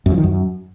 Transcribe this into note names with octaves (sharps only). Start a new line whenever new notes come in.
F#2
F3
D#3
F#2